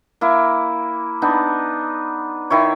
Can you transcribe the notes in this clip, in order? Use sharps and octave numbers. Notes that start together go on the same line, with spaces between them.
A#3 E4
B3 D4 D#4
D#3 E4 C#5